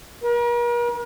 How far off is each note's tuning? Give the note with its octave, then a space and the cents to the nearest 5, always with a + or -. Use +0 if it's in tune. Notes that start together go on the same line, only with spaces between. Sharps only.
A#4 +40